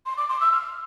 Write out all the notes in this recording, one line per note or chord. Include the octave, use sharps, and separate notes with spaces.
C6
D6
C6
E6
F6